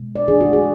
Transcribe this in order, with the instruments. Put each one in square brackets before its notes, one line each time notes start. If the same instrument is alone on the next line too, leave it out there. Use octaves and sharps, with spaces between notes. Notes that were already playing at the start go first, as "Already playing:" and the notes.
Already playing: [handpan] B2 G#3
D5
E3 A3 D4 G#4
F#4
G#4